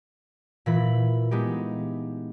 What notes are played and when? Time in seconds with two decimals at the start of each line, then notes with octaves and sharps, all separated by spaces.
0.66 A#2 E3 B5
1.31 G#3 B3 D#4 G4